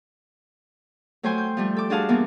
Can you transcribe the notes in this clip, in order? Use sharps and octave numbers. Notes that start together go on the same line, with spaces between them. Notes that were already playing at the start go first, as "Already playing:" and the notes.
F#3 A3 C5 G5 G#5 C6
G6
F3 G3 A3
A4 D6
D4 F#4 G#4 F5 A5
E3 F3 G3 A#3 B3